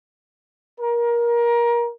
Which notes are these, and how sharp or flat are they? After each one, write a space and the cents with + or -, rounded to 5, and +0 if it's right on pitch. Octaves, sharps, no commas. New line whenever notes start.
A#4 +20